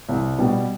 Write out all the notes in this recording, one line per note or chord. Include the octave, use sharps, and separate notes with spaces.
C2
B2 G3